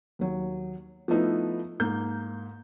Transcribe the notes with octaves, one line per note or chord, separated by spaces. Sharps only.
D#2 F#3
F3 A3 B3 D#4 E4 B4
G#2 A#3 G6